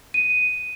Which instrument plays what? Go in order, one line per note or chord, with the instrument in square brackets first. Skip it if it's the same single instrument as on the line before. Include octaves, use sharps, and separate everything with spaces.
[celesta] D#7